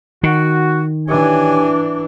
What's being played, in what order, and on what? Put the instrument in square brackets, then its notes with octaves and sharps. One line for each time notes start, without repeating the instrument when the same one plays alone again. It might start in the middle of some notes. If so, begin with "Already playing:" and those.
[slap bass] D#3 [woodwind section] F#4
[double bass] E3 D4 [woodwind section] G4 C#5 G#5